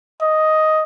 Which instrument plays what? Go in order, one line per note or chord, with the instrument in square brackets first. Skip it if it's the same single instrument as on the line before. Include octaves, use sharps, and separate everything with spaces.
[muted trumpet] D#5